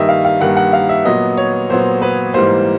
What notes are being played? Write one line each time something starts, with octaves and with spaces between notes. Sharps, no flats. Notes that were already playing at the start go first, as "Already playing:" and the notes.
Already playing: G2 D#3 G3 A#3 D#5 E5
F5
F5
G2 D#3 G3 A#3 F#5
F#5
F5
E5
A#2 F#3 B3 D#5
C#5
A#2 F#3 B3 C5
B4
G#2 E3 G3 A#3 C5